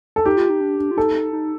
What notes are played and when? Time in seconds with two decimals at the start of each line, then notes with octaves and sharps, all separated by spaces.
0.16 A4
0.25 D#4 G4
0.37 F4
0.50 D#4
0.61 D4
0.79 D4
0.91 F4
0.97 D#4 A4
1.33 D#4